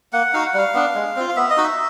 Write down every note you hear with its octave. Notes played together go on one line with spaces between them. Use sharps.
A#3 F#5
D#4 F#4 F5
F#5
G3 F5
B3 D4
G#3
C4 F4
F5
B3 E5
D#5
D#4 F#4
E5